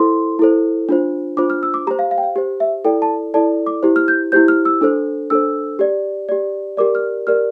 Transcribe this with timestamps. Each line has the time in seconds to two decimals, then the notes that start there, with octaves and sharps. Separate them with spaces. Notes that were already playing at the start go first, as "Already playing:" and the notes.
Already playing: E4 A4 C5 C6
0.39 E4 A4 C5
0.89 D4 F4 C5
1.37 D4 F4 C5 D6
1.50 F6
1.63 E6
1.74 D6
1.87 G4 A#5
1.91 C5
1.99 F5
2.11 F5
2.18 G5
2.23 F5
2.36 G4 C5
2.60 E5
2.85 E4 A4 D5 G5
3.02 A5
3.34 E4 A4 D5 A5
3.66 D6
3.83 E4 G4 C5
3.96 F6
4.08 G6
4.32 E4 G4 C5 G6
4.48 F6
4.65 E6
4.81 D4 A4 C5
5.30 D4 A4 C5 E6
5.79 G4 D5
6.29 G4 D5
6.77 G4 A#4 D5 D6
6.95 F6
7.27 G4 A#4 D5 F6